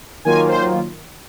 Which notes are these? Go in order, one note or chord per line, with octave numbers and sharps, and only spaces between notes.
D#3 F#3 A#3 F4 G#5
C5